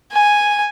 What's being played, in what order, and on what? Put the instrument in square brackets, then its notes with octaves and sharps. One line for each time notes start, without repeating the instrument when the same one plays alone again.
[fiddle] G#5